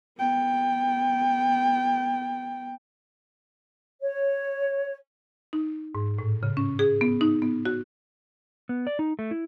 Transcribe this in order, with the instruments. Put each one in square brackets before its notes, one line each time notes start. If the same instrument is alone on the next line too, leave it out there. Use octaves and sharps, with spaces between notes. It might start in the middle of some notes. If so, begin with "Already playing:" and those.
[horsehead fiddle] B3 G5
[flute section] C#5
[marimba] D#4
G#2
A2
C#3
C#4
G#4
B3
D#4
B3
F#4
[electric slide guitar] B3
D5
D#4
A3
E4